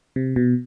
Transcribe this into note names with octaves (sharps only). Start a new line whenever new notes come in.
C3
B2